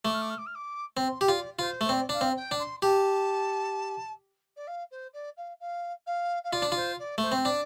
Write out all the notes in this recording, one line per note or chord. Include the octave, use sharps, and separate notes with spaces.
A3 D6
F6
D6
F6
D6
F6
D6
C4 C6
G4
F4 D5
F4 C5
A3 C5
C4 D5
D4 F5
C4
G5
D4
C6
G4 A5
D5
F5
C5
D5
F5
F5
F5
F5
F4 D5
D4
F4 C5
D5
A3 C5
C4
D4 D5